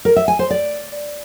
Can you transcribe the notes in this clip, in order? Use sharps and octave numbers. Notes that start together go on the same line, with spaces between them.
A#4
E5
G#5
C5
D5